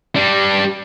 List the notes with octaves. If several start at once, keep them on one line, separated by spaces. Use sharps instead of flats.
G3 D4